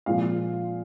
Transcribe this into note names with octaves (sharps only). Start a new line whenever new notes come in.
A#2 F3 G#3 C4 F5